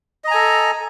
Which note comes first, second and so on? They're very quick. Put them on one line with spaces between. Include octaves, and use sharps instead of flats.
D#5 A#5 G#5 A4